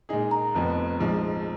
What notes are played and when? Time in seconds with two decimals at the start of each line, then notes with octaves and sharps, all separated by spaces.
0.09 A#2 G#3 D#4 G#4
0.31 A#5
0.54 F1 F2 F3 B3
1.00 A#1 G#2 F3